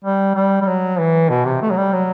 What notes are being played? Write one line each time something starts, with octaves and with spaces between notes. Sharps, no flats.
G3
G3
G3
F#3
E3
B2
C3
A3
F#3
G3
F#3